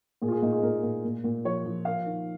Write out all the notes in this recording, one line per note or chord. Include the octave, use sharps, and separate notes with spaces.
A#2 G#4
F4
G#4
A#2 D#4
G#4
A#2 A#4
A#2
A#2
A#2
F3 C#5
F3
A#3 F5
D#3